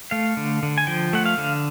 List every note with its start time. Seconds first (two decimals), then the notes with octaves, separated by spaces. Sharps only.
0.11 A3 F5
0.37 D3
0.63 D3
0.78 G#5
0.87 F3 G5
1.13 A3 F#5
1.26 F5
1.38 D3